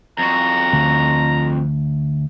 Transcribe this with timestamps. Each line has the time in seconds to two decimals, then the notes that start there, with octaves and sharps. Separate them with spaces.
0.18 F2 F#4 A#5
0.73 D2